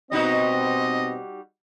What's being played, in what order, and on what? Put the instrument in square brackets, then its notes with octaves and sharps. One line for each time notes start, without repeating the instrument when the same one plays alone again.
[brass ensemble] B2 C4 [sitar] G3 D#4 F#4 [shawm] D#5